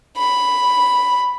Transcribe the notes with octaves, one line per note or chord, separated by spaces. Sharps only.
B5